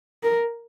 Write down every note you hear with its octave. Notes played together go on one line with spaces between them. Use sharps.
A#4